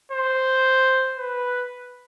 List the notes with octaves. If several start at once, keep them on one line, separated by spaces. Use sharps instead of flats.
C5
B4